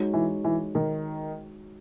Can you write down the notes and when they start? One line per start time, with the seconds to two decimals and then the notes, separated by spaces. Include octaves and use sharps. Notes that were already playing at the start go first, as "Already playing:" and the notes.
Already playing: G#3 D#4 F#4 C#5
0.14 E3
0.45 E3
0.75 D#3